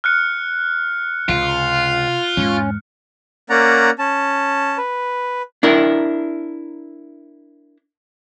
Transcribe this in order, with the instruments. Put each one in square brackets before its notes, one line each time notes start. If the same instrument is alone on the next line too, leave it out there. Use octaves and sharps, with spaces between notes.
[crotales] F6 F#6 C#7
[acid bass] C#2 [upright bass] C3 [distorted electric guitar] F4
[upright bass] E2 G#2 [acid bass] C#4
[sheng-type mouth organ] A#3 C#4 D5 F#5 A#5
C#4 A5
B4
[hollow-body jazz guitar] D4 E4 A#4